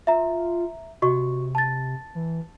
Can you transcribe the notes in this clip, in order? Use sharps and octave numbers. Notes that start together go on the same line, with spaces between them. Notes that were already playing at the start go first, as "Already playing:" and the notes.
F4 E5 A#5
C3 F#4 D#5 C#6
A5 A6
E3